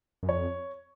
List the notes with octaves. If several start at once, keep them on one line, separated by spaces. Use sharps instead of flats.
F#2
F2 C#5